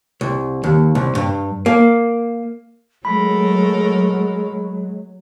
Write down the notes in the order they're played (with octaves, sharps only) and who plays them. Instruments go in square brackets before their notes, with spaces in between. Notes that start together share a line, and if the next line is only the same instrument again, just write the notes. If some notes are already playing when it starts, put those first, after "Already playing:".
[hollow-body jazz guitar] C2
D#2
C2
G2
A#3
[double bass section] F#3 [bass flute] G#3 [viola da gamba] A3 A4 A#4 [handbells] B5